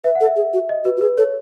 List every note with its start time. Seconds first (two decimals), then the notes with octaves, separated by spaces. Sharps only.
0.04 B4 E5
0.15 F#5
0.21 A4
0.26 E5
0.36 G#4
0.53 F#4
0.69 D#5
0.85 F#4 B4
0.97 F#4
1.01 G#4 B4
1.17 A4 C#5